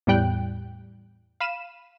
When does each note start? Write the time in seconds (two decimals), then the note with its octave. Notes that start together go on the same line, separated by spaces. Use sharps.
0.07 E2 A2 G3 G5 F#6
1.40 F5 B5 D#7 E7